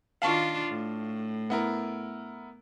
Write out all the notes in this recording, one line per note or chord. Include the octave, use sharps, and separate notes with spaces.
D#3 D4 F4 F5 A5 C#6
A2
B3 E4 A#4